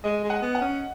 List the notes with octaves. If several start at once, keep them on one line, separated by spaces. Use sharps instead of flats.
G#3 D#5
G#3
F#5
B3
F#5
C#4